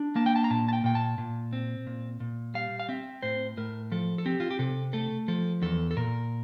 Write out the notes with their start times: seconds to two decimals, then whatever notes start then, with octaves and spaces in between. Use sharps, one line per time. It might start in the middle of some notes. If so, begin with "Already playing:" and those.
Already playing: D4
0.16 A#3 A5
0.26 G5
0.36 A5
0.44 A#5
0.50 A#2 A5
0.68 A5
0.73 G5
0.84 A#2 G5
0.95 A5
1.18 A#2
1.53 C4
1.87 A#2
2.20 A#2
2.54 G3 F5
2.80 F5
2.89 C4 E5
3.23 A2 C5
3.57 A2 A#4
3.92 F3 A4
4.18 A4
4.26 C4 G4
4.40 F4
4.51 G4
4.59 C3 A4
4.93 A3 A4
5.28 F3 A4
5.62 E2 A4
5.91 A4
5.97 A#2 A#4